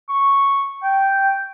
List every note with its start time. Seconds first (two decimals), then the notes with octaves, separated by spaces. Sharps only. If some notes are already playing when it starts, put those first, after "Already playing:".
0.09 C#6
0.83 G5